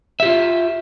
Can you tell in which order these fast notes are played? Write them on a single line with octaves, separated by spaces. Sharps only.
E5 G4 F4